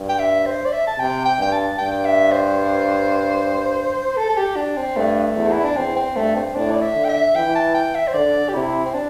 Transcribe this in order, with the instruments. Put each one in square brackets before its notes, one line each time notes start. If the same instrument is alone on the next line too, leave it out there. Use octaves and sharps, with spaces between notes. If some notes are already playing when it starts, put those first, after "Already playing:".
Already playing: [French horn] G2
[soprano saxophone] G5
E5
C5
D5
E5
A5
[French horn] C3 [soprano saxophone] G5
[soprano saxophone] G5
[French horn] G2 [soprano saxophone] G5
[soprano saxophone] A5
[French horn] G2 [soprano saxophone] G5
[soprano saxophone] E5
C5
A4
A4
G4
D4
C4
[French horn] G2 [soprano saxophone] A3
[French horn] E2
[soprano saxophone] E4
D4
[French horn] E2 [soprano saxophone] C4
[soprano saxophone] C4
[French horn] G2 [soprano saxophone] A3
[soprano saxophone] C4
[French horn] A2 [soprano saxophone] D4
[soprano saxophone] D5
E5
[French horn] D3
[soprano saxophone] G5
E5
[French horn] E3 [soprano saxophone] G5
[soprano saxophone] A5
G5
E5
C5
[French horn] D3 [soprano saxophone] D5
[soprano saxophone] G4
[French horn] C3 [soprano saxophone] E4
[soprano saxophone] C4
D4